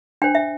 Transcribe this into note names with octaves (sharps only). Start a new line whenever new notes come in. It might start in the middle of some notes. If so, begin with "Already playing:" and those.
D4 C5 G5
E5